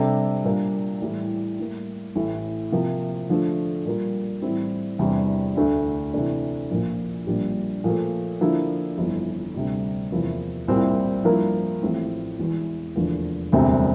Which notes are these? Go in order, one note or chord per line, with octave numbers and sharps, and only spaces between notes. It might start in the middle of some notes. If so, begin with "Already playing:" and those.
Already playing: C3 G3 D4 A4 D5
A#2 G3 A#3 D4
A2 E3 G3
A2 G3 A#3
A1 A2 E3
C3 F3 A#3
D3 F3 A3
A#2 G3 A#3 F4
A2 E3 G3 C4 E4
E2 C3 E3 G3 D4
D2 D3 A3
C3 E3 A3 D4
A#1 A#2 F3
A#1 A#2 G3 D4 G4
A#2 F3 A3
D3 F3 A#3 E4
G1 F2 E3
D2 C3 G3
E2 C3 F3 A#3 E4
C2 A#2 G3 C4 E4
G2 F3 A#3 E4 A#4
A1 A2 F3 C4
E1 E2 E3
F1 E2 D3 F3 A#3
E1 D2 C3 G3 C4